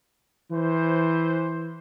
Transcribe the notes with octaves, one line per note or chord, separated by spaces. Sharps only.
E3 C5